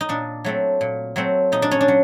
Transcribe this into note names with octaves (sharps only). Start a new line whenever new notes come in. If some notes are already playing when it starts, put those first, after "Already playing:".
D#4
A#2 D4
F#3 A3 C4
A#2
F#3 A3 C4
A#2 D#4
D4
C#4
D4
F#3